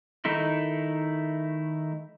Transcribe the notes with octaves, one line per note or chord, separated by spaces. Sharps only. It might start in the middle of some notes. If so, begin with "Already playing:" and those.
D#3 A3 D#4 E4